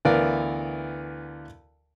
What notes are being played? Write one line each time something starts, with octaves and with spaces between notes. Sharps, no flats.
D2 E3 B3 A#4 D5 F5